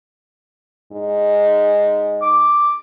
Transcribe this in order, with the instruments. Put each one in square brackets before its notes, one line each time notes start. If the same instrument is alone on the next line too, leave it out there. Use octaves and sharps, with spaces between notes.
[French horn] G#2
[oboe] D6